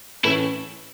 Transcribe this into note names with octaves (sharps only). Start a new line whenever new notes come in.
A2 E3 A3 C#4 E4